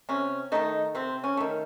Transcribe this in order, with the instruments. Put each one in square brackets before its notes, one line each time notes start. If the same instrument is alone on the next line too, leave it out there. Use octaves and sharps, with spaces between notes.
[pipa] C3 C#4
D#3 A3 D#4
C3 C4
C#4
D#3 A3